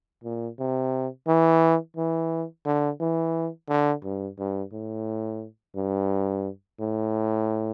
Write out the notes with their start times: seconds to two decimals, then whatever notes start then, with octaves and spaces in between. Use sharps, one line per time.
0.24 A#2
0.59 C3
1.28 E3
1.96 E3
2.66 D3
3.00 E3
3.69 D3
4.04 G2
4.39 G2
4.73 A2
5.76 G2
6.80 A2